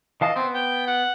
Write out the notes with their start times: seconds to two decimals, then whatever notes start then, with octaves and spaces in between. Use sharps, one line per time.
0.21 E3 D#5 F5 A5
0.36 B3 C4
0.55 G5
0.87 F#5